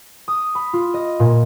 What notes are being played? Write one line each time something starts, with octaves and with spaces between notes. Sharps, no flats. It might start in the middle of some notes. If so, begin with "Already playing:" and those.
D#6
B5
F4
D#5
A#2